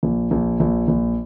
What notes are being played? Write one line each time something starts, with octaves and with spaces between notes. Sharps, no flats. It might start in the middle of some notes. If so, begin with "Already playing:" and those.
A#1
A#1
A#1
A#1